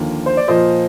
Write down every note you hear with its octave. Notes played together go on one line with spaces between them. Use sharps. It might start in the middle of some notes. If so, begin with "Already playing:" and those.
Already playing: D#2 D3 F3 A#3
C5
D5
A#2 F3 A#3 C5 D#5